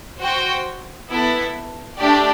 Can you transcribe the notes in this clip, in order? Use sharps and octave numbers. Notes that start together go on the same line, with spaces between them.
F#4 C5 G5
B3 E4 A4
A3 D4 G4 D5